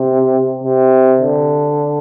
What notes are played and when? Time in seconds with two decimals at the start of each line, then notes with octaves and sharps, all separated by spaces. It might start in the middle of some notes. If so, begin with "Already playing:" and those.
Already playing: C3
0.63 C3
1.21 D3